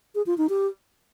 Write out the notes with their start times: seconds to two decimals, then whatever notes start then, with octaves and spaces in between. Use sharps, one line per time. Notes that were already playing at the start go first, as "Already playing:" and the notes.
0.15 G#4
0.26 F4
0.38 D#4
0.49 G4